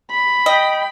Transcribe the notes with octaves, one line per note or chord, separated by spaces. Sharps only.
B5
D#5 G5